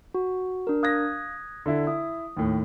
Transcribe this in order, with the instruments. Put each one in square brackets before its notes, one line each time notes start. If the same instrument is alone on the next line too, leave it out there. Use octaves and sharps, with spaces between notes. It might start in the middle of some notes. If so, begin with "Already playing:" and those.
[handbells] F#4
D4 A#4
[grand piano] F5 A#6 [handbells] D#6 F#6 G#6
[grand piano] D3 D4 E4
[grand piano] E4 [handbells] D#6
[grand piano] D#2 A2